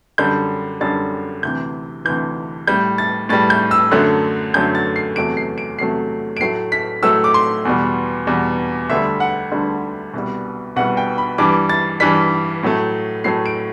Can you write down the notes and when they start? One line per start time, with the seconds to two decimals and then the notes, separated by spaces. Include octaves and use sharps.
0.18 F#2 D3 G3 G6
0.81 F#2 D3 G3 A6
1.43 D2 C3 E3 G6
2.05 D2 C3 E3 G6
2.67 A2 G3 G6
2.98 A6
3.29 A2 G3 A6
3.50 G6
3.71 E6
3.91 F#2 D3 F#3 A3 F#6
4.54 F#2 D3 F#3 A3 G6
4.75 A6
4.96 C7
5.16 E2 C3 F#3 A3 D7
5.37 C7
5.58 D7
5.79 E2 C3 F#3 A3 C7
6.37 D7
6.40 A2 F#3 A3 C7
6.72 B6
7.03 A2 F#3 A3 E6
7.24 D6
7.34 C6
7.65 E2 B2 G3
8.27 E2 B2 G3
8.90 D2 D3 G3 E5
9.20 F#5
9.52 D2 D3 G3
10.14 C2 B2 G3
10.76 C2 B2 G3 F#5
10.97 G5
11.18 B5
11.38 G2 E3 G3 D6
11.69 A6
12.00 G2 E3 G3 B6
12.63 A2 F#3 A3
13.24 A2 F#3 A3 C7
13.46 D7